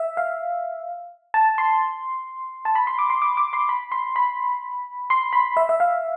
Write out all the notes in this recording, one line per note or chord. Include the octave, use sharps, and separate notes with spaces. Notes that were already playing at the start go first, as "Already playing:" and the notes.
Already playing: E5
F5
A5
C6
A5
B5
C6
D6
C6
D6
D6
C6
B5
C6
B5
C6
B5
E5
E5
F5